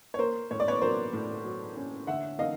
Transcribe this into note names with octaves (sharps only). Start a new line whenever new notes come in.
C#5
A#3 A#4 C5
A2 C#5
D5
B4 C#5
F#3 A#4 C5
A2
F#3
C#4
D3 E5 F#5
D#4 D#5 F5